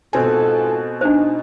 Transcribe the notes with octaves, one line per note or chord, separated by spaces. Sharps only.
G#2 B2 C4 F4 A4 G#5
D4 D#4 C5